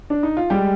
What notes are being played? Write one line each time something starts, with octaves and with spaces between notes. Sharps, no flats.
D4
D#4
F4
G3 G#3 G4